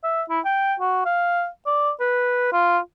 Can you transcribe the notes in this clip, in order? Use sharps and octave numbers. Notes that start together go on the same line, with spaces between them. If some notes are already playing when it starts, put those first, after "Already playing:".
E5
E4
G5
F#4
F5
D5
B4
F4